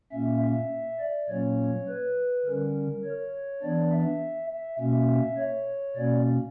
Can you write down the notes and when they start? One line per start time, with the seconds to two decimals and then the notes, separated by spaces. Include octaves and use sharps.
0.12 A#2 A#3 C#4 E5
0.42 E5
1.00 D5
1.29 A#2 F#3 A#3 C#4 C#5
1.88 B4
2.45 D3 G3 C#4 A#4
3.04 C#5
3.63 E3 B3 D4 D5
3.92 E5
4.51 E5
4.80 B2 A#3 C#4 E5
5.38 C#5
5.96 B2 A#3 C#4 D5